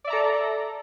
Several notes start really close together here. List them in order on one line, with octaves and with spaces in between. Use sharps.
D5 E5 A#5 A4